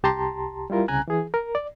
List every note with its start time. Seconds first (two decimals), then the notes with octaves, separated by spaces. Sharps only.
0.03 C2 G4 A5 A#5 C6
0.70 G3 E4 F4 A#4
0.88 C2 C#3 G#5 A#5 F#6
1.08 E3 G#4
1.34 A#4
1.55 D5